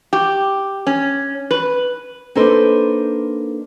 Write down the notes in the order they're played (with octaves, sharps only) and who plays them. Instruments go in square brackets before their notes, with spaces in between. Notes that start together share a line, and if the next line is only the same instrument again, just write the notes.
[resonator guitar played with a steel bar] G4
C#4
B4
[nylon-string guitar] A#3 D4 D#4 A4 B4 C5